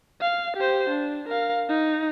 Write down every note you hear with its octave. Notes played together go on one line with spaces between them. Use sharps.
F5
G4 C5
D4
A#4 F5
D#4